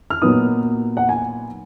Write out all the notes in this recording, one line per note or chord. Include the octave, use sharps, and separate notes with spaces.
F6
A#2 F#3 B3 D#4 D#6
F#5
G#5